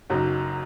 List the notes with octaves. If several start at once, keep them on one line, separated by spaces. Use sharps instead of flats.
F#1 F#2 F#3 D#4